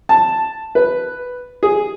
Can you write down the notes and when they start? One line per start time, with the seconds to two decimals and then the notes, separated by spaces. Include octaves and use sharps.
0.09 A5
0.75 B4
1.63 G#4